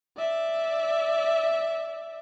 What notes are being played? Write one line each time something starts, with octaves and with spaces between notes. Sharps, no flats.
D5 E5